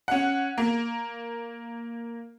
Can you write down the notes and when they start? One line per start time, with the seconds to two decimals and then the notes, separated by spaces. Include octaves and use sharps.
0.08 C#4 F#5
0.58 A#3